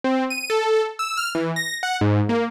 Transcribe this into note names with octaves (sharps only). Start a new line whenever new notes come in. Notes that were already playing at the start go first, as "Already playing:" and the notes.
C4
D#7
A4
E6
F6
E3
A#6
F#5
G#2
A#3